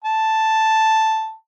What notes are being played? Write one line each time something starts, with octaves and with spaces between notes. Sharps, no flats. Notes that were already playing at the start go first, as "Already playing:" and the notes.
A5